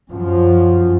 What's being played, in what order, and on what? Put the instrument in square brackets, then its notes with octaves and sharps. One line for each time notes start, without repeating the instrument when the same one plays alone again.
[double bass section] F#2 F3